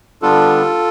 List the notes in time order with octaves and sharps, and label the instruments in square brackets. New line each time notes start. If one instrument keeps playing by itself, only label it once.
[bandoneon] D3 G3 B3 D4 F4 A4